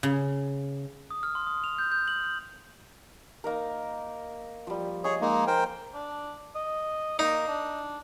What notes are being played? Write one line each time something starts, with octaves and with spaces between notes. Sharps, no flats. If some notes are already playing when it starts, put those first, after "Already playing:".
C#3
D#6
F6
C6
D#6
F7
G6
G6
F#7
G6
A#3 D#4 A#4
F3 G3
G#4 C#5 D#5 G#5
G#3 A#3 D#4
A#4 C5 G5
D4
D#5
A#3 D#4
D4